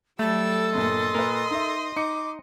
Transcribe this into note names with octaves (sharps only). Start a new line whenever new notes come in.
F#3 G3 A3 A4 E6
G1 A#2 D#5 C6
A#2 A#4 B4
D#4 E5
D#4 D6 C#7